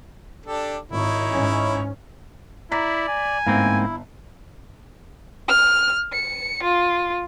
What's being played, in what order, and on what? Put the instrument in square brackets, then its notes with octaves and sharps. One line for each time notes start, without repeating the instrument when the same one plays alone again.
[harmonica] D4 G4 A4
[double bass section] G#1 [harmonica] D#4 E4 C#5
[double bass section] G#2 C#4
[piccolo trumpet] E4 [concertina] D5 [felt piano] A#5 B6
[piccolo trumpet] G#5
[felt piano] G1 F5 [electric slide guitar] G#2 A#3 C4 [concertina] E4
[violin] F6
C#7
F4